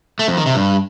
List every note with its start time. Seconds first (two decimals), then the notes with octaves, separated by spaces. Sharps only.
0.19 A3
0.28 F2
0.37 D#3
0.46 C3
0.55 G2